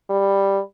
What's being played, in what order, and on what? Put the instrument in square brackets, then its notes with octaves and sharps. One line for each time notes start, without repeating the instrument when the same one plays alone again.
[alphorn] G3